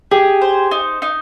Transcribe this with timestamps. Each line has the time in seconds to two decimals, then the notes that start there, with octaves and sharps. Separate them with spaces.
0.11 G4 G#4
0.41 C5
0.71 D#4
1.02 D#4